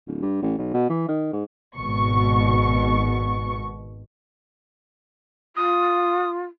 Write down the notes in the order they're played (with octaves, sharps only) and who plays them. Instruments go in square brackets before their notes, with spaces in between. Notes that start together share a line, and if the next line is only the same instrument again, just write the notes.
[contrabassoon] D1
G2
A1
B1
B2
E3
D#3
G#2
[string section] G#1 B2 C#6
[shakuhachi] F4 [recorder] D#6